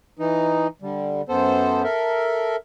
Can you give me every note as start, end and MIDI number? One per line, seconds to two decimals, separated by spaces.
0.19 0.67 52
0.19 0.67 63
0.82 1.22 50
0.82 1.22 55
1.29 1.83 42
1.29 1.83 59
1.29 1.83 69
1.29 1.83 72
1.84 2.56 69
1.84 2.56 70
1.84 2.56 76